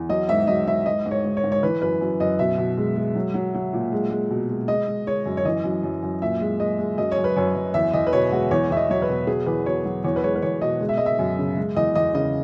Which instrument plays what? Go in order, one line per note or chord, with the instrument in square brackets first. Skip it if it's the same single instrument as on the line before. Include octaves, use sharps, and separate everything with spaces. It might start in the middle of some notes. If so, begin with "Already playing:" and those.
Already playing: [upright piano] E2
F#3 D#5
G#2 E5
F#3 D#5
G#2 E5
G#2 D#5
G#2
C#5
G#2
C#5
G#2
C#5
E3 B4
F#2 B4
F#2
F#2 D#5
B2 E5
B2
G#3
G#3
F#3
F#3
F#3
A#2
G#3
G#3
B2
G#3
G#3 D#5
G#3
G#3 C#5
F#2
C#5
E3 D#5
F#2
F#2
F#2
A#2 E5
G#3
G#3 D#5
G#3
F#2 D#5
C#5
F#2
B4
F#2 C#5
F#2
E2 E5
E2 D#5
B4
B2 C#5
G#3 F#4
E2 C#5
E2 E5
D#5
F#3 C#5
B4
B2
F#3 G#4
E2 B4
B2 C#5
F#3
E2 C#5
B4
G#3 C#5
B4
E2 C#5
B2 D#5
G#3
E5
G#3 D#5
E5
F#2
C#3
G#3
E2 D#5
E2 D#5
C#3 D#5